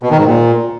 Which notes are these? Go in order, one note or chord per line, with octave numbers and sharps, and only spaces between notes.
B2
D#3
G#2
A#2